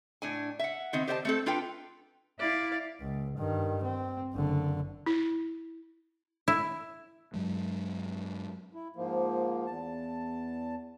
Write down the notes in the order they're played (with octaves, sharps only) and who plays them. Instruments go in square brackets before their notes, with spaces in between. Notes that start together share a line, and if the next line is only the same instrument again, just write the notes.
[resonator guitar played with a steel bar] A2 D4 G#5
E5 F#5
B2 D#3 C4 D#5
G4 C5 D5 D#5 G5 A5
A3 C4 A4
D4 F4 A4 B4 G5
[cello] E4 [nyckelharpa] D5 F5
[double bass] C#2
G2 D#3
C4
F#1 D3
[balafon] E4
[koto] E4
[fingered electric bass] G2 F#3 G#3
[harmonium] E4
G#2 F3 A#3
E2 A5